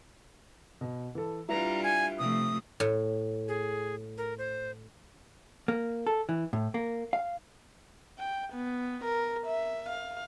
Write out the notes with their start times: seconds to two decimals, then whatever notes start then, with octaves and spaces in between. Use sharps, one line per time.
0.81 B2
1.15 E3 A4
1.49 G3 D4 E4 F4 B4 E5 A#5
1.83 G#5
2.19 C3 F3 A3 D#6
2.80 A2
3.48 G#4
4.18 A#4
4.38 C5
5.68 A#3
6.07 A4
6.29 E3
6.53 A2
6.74 A#3
7.13 F5
8.18 G5
8.53 B3
9.04 A#4
9.46 E5
9.89 F5